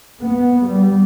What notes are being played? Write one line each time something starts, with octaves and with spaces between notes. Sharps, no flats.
B3
G3